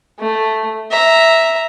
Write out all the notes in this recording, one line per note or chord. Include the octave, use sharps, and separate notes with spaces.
A3
E5 A#5